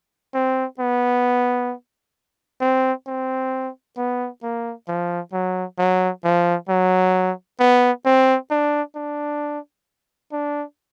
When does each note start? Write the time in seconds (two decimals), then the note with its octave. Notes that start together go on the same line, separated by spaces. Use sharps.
0.34 C4
0.80 B3
2.61 C4
3.07 C4
3.97 B3
4.43 A#3
4.88 F3
5.33 F#3
5.79 F#3
6.24 F3
6.69 F#3
7.60 B3
8.06 C4
8.51 D4
8.96 D4
10.32 D4